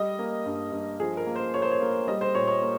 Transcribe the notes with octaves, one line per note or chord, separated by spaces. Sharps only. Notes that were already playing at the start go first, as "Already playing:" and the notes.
Already playing: G3 D#5
A#3
G2
G2
F3 G#4
A#4
A#3
C5
F3 C#5
C5
C#5
A#3
G3 D#5
C5
A#2 C#5
C#5
A#3